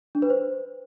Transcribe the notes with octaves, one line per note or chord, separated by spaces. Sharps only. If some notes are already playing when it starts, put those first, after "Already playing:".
D4
B4
C5